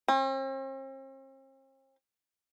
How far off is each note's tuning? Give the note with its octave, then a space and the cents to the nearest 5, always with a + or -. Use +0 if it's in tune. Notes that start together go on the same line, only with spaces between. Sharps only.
C4 +45